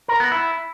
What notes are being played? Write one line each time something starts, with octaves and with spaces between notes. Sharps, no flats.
A#4
B3
E4